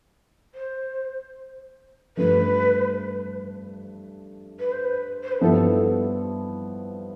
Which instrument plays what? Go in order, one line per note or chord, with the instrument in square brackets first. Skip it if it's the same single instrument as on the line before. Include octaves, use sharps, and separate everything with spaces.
[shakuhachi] C5
[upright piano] G2 F3 A3 [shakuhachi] B4
[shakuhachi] B4
C5
B4
C5
B4
[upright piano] G2 F3 B3 E4 [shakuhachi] A4